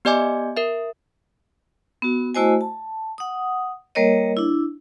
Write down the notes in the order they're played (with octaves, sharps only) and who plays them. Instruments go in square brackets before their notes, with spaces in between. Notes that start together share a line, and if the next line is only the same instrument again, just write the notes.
[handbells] B3 G4 D5 D#5 G#5 D6
A#4 E5
[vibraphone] B3 F#4
A3 E4 F#4 C5 D#5 G#5
A5
F#5 D#6
G3 A#3 A#4 C#5 D#5
D4 E4